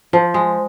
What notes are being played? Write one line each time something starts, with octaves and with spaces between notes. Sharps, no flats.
F3
G#3